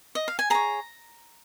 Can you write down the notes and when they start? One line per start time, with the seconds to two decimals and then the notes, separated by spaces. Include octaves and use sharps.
0.15 D#5
0.28 F5
0.39 G#5
0.50 G#4 C#5 A#5